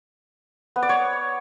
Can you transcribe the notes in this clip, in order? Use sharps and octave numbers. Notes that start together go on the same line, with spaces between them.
B3
D5
C#5